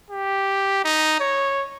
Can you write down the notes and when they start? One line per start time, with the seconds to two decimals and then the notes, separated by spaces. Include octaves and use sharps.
0.10 G4
0.84 D#4
1.20 C#5